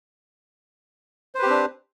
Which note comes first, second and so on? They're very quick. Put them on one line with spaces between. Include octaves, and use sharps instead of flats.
C5 B4 G4 C4 D4